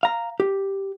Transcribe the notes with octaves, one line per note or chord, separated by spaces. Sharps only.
F5 A#5
G4